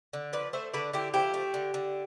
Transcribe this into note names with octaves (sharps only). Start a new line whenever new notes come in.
D3
F3 B4 D5
A3 C5 E5
D3 B4 D5
D3 E4 G4
F3 E4 G4
A3
D3
D3